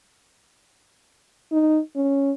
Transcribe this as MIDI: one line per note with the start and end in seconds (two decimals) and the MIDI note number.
1.52 1.80 63
1.96 2.31 61